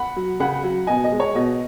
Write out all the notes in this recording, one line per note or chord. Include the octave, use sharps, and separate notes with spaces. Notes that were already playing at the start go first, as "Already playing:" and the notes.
Already playing: F#5 B5
F#3
C#3 F#5 B5
F#3
B2 D#5 G#5
D#5
G#3
C#5
B2 D#5